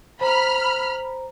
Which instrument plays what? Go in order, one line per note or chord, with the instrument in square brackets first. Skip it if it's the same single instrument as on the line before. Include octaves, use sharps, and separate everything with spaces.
[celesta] C5 A#5 [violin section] B5 F6